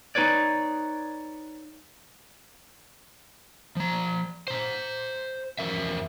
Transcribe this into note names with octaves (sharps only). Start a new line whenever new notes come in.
D#4 F4 B4 C#5 D5
F3 A#5
C5 A#5
E2 F3 A#4 E5